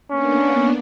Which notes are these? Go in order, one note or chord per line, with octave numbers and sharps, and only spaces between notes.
A#3 B3 C#4 D4